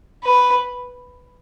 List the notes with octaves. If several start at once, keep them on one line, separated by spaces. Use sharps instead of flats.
B4